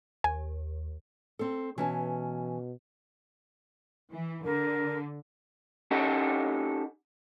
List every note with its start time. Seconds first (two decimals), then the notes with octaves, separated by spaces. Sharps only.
0.24 D#2 G#5
1.39 C4 A4
1.78 B2 E3 C#4 A5
4.13 E3
4.44 D3 A#4
5.91 C#4 D#4 G4 A4 D#5 F#5